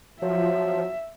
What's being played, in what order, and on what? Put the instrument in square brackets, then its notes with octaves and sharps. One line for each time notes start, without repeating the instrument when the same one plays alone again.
[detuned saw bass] F3 [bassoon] F#3 [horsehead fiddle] E5